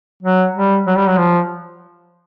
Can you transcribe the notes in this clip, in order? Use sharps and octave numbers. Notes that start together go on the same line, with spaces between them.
F#3
G3
F#3
G3
F#3
F3